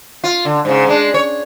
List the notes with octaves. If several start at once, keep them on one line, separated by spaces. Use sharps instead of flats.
F4
D3
G#2 C#3
G#3 D4
C#5